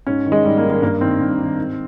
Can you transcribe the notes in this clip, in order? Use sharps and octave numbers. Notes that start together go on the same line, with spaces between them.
G#2 C#4
D#3
G#3
G#2 G3
A#3
D#3
A#3
G2 A#3
D#3 C4
G2
D#3
G#2